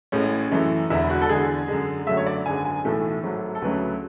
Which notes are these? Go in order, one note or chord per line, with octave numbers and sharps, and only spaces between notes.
A1 A2 G#3 C#4
F#2 E3 A3
E1 E2 D3 E4
F#4
A4
E2 D3 G#3 G#4
F#2 D3 G#3
F#2 D3 F#3 A3 E5
C#5
D5
G#1 F#2 D3 G#3 G#5
G#5
B1 A2 E3 A3 A4
G#1 G#2 F#3 A3
A4
D2 C#3 F#3 A3 B4